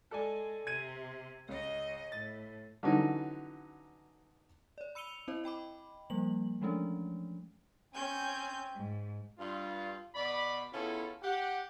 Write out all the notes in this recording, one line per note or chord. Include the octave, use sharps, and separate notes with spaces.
G#3 A4 D5 G#5
C3 G#6 D#7
C#2 C#5 D#5
A2 A6
D3 E3 F#3 C#4 D#4
C#5 D5
B5 E6 C#7 D#7 F7 G7
C4 E4 C5 D#5
D#5 G5 B5 D6
F3 G3 A#3 F#7
E3 F3 G#3 A3 C#4 D4
C4 C#4 G5 G#5 G6
G#2
G2 F4
B2 D5 B5
C#3 B3 C#4 E4 F4 A4
G4 F#5